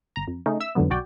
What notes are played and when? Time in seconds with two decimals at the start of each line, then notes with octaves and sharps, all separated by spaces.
0.16 G1 A#5
0.28 F2
0.46 C#3 A3 C#4 D#4
0.60 E5 E6
0.75 F2 G#2 D3 F#3 B3
0.90 B1 F#4 D5 G5